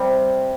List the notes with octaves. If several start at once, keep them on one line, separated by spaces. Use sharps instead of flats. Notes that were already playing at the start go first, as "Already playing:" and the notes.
Already playing: C3 G3